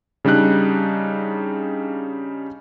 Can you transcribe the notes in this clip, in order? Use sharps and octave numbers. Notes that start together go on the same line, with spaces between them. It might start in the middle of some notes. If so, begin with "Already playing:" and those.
C#3 G3 D4 D#4 F#6